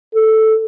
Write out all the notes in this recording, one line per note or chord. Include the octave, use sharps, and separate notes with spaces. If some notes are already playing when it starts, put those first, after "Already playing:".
A4